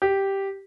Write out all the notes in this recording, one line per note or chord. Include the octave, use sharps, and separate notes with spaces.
G4